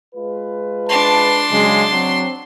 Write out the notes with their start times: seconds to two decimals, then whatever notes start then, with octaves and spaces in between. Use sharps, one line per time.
0.15 G#3 F4 B4
0.89 D4 A5 C6
1.51 C#3 F#3 G#3
1.92 F#3 C4